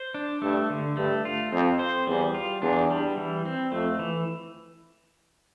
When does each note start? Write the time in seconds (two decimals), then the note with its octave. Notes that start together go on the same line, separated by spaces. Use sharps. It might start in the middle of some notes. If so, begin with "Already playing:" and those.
Already playing: C5
0.14 D4
0.42 G2 A3
0.70 D3
0.97 G2 A3
1.25 F4
1.52 F2 C4
1.79 C5
2.07 E2 G3
2.34 F4
2.62 E2 D4
2.90 G3
3.17 E3
3.45 C4
3.72 F2 A3
3.99 E3